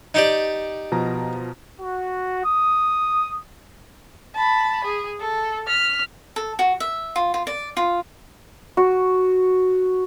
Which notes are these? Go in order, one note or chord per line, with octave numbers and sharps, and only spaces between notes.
D#4 G4 D5
B2 F3 A#5
F#4
D#6
A5 B5
G#4
A4
F6 B6
A4
F#4
E5
F4
F4
D5
F4
F#4